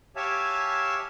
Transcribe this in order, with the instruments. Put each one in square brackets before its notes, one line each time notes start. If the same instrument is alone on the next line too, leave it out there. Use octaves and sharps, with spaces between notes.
[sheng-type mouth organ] G4 C#5 E5 F5 G#5 A5